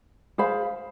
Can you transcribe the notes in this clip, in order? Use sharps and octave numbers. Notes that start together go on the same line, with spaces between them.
G#4 C5 F5 B5